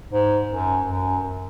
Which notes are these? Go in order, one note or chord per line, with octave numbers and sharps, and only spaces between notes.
G#2
F#2
F#2